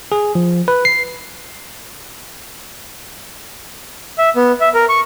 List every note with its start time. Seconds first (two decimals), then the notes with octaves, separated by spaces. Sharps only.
0.12 G#4
0.35 F3
0.68 B4
0.85 C7
4.18 E5
4.36 B3
4.61 E5
4.74 A#4
4.89 C#6